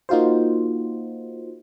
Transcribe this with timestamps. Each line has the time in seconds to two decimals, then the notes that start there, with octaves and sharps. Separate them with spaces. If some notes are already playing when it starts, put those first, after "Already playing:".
0.09 A#3 D#4 F4 F#4 C5